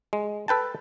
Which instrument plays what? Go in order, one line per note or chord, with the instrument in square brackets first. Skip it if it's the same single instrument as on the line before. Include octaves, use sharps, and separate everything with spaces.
[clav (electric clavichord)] G#3
A4 B4 G5 A5